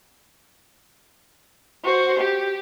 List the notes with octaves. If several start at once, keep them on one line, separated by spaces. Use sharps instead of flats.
F#4 C5
G4